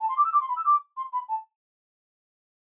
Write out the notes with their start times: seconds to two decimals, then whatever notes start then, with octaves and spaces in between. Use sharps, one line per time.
0.01 A5
0.09 C6
0.17 D6
0.24 E6
0.33 D6
0.41 C6
0.49 B5
0.57 E6
0.65 D6
0.97 C6
1.13 B5
1.29 A5